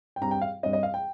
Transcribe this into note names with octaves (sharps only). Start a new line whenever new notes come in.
G5
G2 G3 C4 A#5
G5
F5
G2 G3 C4 D#5
D#5
F5
G5